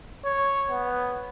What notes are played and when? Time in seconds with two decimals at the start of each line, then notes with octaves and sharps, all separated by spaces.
0.25 C#5
0.71 B3